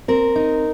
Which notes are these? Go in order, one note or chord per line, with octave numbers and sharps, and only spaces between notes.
C4 A#4
D#4